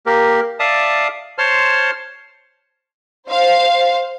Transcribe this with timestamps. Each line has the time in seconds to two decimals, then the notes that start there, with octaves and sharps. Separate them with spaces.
0.06 A#3 G4 A#4
0.60 D5 E5 F5 A5 D#6
1.38 C5 C#5 A5 C6 F6
3.29 C5 F5